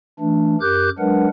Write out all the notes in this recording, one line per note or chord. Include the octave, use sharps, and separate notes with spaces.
E3 A3 D4
F#2 G4 A#4 D6 F#6 G6
F#3 G#3 D4 A#4 B4 F#5